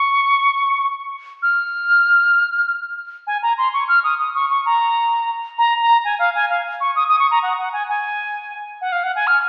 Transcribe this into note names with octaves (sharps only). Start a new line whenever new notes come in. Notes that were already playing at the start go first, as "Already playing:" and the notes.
Already playing: C#6
F6
G#5
A#5
C6
C#6
F6
D#6
D#6
C#6
C#6
A#5
A#5
A#5
G#5
F5
G#5
F5
C#6
D#6
D#6
C#6
A#5
F#5
F#5
G#5
G#5
F#5
F5
F#5
G#5
F6